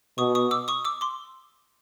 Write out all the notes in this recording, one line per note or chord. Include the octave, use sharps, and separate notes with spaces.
B2 C#6 D#6
C#6 D#6
D6 E6
C#6 D#6
D6 E6
C6 D6